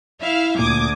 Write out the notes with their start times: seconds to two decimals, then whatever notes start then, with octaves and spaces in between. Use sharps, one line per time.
0.20 E4 E5 F5 F6
0.59 D2 A#2 D6 D#6 G#6